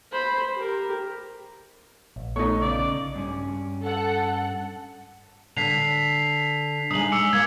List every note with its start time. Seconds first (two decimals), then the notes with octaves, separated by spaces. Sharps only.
0.12 C5 B5
0.55 G4 A#4
2.16 A#1
2.36 A3 B3 D#4 A4 C#5
2.61 C#3 D5
3.16 G2 C#4
3.83 A4 F#5
5.57 D3 B6 C7 F7
6.91 G#3 D#4 D#6 F#7
7.12 D6 E6 C#7
7.33 A#3 G#6